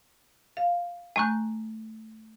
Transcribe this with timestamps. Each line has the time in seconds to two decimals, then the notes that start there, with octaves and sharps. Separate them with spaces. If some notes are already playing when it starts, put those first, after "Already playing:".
0.57 F5
1.16 A3 G#5 A#5 C#6 F#6 G6